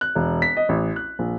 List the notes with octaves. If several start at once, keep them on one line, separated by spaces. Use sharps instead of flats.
F#6
E1
B6
D#5
A1
F#6
A#1